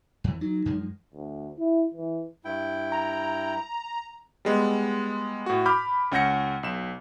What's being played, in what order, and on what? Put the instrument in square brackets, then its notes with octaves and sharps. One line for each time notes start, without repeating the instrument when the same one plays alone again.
[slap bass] F2 E3
[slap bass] F#3 [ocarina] D#4
[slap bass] F#2 F3 G#3
[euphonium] D2
E4
E3
[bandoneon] G2 E4 G5
[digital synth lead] A#5
[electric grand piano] G3 G#3 B3
A2 F#4
B5 D6 F6 G6
C#2 C#4 F#5 G6 A#6 C#7
B1 E7